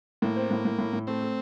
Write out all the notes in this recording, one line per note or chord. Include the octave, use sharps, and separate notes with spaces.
A2 A#3
C4
A2
A2
A2
A2
A3 C4
A3